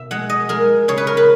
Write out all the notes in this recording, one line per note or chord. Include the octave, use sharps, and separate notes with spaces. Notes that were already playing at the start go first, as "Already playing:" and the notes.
Already playing: B2 E5
G#3 F#5
D#5
G#3 A#4
C#3 C#5
B4
A#4
B4